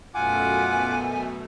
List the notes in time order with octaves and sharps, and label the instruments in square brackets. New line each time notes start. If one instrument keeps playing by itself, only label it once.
[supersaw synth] F#2 B2 A3 [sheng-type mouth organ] F4 F#5 D6 [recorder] G#5